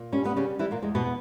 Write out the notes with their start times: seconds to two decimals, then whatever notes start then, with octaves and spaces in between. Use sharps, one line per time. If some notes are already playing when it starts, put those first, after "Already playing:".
Already playing: A#2
0.12 G3 C#4
0.25 B3
0.36 C#3 G3 C#4
0.59 E3 G3 E4
0.71 A#2 A#3
0.82 E2 G#3
0.95 B2 B3